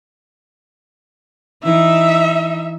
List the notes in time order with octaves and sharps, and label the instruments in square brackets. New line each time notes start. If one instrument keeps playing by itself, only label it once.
[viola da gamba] E3 D#4 [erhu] E5